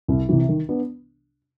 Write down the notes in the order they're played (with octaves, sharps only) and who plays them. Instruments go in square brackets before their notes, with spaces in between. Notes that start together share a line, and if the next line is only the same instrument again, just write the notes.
[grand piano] C2
C3 E3
D#3
B3 D4